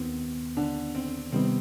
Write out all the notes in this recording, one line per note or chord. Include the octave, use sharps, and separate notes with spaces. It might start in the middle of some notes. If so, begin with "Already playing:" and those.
Already playing: D#2 D#3 B3 C4
D3 D4
C4
C3 D#3 G3 B3 C4